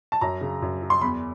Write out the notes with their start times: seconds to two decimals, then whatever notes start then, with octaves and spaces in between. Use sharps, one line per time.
0.12 A5
0.21 F#2 A#5
0.41 C#3
0.62 F#2
0.82 F#3
0.90 C6
1.01 E2 B5